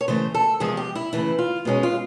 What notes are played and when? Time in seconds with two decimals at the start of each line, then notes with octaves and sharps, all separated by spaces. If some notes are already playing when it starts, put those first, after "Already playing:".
0.01 C#5
0.08 C#3 E3 A3 C5
0.34 A4
0.60 E2 C3 F3 G#3 G#4
0.77 G4
0.95 E4
1.13 C#3 E3 A3 E4
1.39 F4
1.65 B2 G#3 C#4
1.83 F4